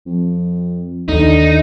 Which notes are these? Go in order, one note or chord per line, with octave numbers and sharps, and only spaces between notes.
F2
D#2 D3 D#3 D#4